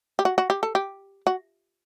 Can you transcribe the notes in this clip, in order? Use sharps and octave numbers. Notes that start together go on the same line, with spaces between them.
G4
F#4
F#4
G4
A4
G4
F#4